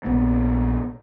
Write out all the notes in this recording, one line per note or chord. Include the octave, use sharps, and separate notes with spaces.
A#1 B3 C4